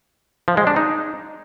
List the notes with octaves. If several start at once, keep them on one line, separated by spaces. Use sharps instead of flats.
F3
G#3
D4
D#4